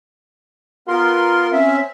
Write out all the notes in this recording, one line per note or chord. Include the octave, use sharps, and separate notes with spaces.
B3 F4 A#4 C6
C4 C#4 E5